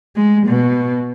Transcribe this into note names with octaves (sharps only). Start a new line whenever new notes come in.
G#3
B2